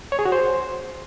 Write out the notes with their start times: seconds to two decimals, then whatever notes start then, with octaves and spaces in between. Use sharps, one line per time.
0.12 C#5
0.19 G#4
0.25 F#4
0.32 C5